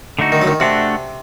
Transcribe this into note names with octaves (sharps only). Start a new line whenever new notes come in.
D3 A3 D#4 F#4
D#3
F#3
D#3
C3 A3 D4 F#4